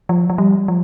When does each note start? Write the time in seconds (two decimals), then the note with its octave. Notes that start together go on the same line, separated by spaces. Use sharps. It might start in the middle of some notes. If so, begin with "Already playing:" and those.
0.09 F3
0.30 F3
0.38 G3
0.68 F3